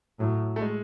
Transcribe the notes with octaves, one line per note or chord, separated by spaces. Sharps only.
A2 F#3
A3
G#3